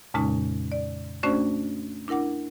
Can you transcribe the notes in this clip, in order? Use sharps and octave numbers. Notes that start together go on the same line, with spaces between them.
F2 A#2 C#3 G#3 C#4 D#4
D5
A3 C#4 D4 F#4 C5 D5
D4 E4 A#4 F#5 D6